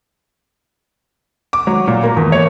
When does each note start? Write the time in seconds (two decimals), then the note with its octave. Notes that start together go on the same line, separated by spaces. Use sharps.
1.53 D6
1.67 F#3
1.88 A#2
2.03 A#3
2.17 E2
2.32 C#5